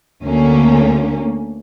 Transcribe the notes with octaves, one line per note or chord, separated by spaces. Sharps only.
D2 D3 A3 A#3 C#4